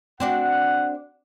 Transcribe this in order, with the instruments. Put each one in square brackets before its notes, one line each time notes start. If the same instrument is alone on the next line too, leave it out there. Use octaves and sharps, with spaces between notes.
[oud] C4 D4 F#4 [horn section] F#5